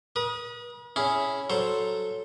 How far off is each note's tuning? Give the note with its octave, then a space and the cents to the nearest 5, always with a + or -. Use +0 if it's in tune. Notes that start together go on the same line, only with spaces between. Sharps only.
B4 -45 D#6 +0
C#4 +0 E4 -5 G#4 +0
F#3 +0 A4 -5 C5 +0